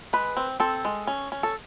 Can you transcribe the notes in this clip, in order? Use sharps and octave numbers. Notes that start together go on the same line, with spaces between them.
G#3 B4
C4
C4 A4
G#3
C#4
C#4
A4